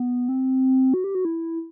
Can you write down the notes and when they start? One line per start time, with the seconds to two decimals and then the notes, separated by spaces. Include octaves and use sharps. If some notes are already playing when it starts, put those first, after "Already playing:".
Already playing: B3
0.29 C4
0.94 F#4
1.04 G4
1.15 F#4
1.25 E4